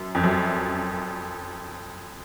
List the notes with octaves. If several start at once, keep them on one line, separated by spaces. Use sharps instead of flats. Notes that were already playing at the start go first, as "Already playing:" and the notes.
Already playing: F#2
F2
F#2